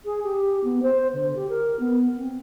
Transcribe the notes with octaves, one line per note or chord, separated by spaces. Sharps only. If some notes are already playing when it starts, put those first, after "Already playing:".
G#4
G4
B3
C5
D3
G4
A#4
B3
C4